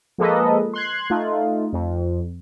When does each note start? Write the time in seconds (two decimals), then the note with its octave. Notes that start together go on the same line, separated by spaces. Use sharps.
0.18 F3 G#3 A#3 A4 B4 D#5
0.74 C6 F#6 G#6
1.10 A3 D#4 F4
1.73 F2